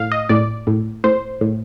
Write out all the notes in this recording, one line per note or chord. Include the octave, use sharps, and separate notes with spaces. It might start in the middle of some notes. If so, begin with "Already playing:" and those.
Already playing: A2 F5
D#5
A2 D5
A2
A2 C5
A2